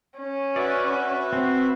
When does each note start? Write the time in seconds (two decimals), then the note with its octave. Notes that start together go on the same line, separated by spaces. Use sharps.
0.19 C#4
0.56 F#4 B4 D5 E5
1.33 C4